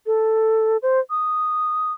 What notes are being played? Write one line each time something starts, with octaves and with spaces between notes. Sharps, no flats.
A4
C5
D#6